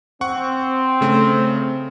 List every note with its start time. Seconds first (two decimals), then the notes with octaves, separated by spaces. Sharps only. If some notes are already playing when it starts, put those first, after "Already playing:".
0.21 C4 F#5 C#6
1.01 C#3 A3